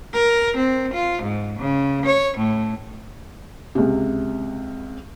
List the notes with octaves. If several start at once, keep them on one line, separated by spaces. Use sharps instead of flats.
A#4
C4
F4
G#2
C#3
C#5
A2
C#2 C3